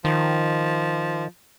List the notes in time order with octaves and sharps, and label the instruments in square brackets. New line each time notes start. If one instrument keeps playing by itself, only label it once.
[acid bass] D#3 [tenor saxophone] F3